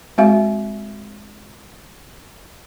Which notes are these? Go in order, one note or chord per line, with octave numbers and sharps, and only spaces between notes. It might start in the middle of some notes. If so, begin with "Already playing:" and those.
G#3 C4 F#4 E5 F5